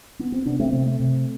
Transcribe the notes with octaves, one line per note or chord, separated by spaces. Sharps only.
B3
C4
C3 B3 D4
A3 C4
C3 A3 C4
A3 C4
C3